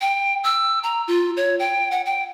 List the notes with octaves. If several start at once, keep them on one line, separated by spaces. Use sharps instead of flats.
G5
E6
A#5
F4
C#5
G5
F#5
G5